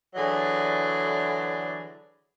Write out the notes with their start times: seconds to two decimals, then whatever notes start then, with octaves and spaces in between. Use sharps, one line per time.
0.15 D3 E3 F#3 G#4 D5